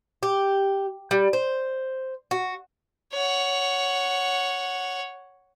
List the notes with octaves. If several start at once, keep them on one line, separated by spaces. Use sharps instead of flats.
G4
G3
C5
F#4
C#5 F#5